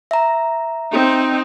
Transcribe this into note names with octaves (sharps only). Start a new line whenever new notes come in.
E5 A#5
C4 D#4